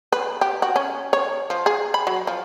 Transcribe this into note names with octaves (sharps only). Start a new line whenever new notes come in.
B4
G4
F#4
C#4
C#5
F3
G#4
B5
F#3
F3